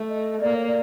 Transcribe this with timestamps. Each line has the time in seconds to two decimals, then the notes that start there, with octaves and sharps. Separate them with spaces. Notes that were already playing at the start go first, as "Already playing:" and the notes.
Already playing: A3
0.10 D#5
0.41 A#3 D5
0.54 C#5
0.68 D5